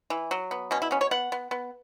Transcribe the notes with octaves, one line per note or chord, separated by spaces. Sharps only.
E3
F#3
B3
B2 C#4
E4
B3 C#4
C#5
B3 F#5
B3
B3